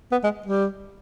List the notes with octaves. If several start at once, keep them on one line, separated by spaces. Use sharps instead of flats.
B3
G#3
G3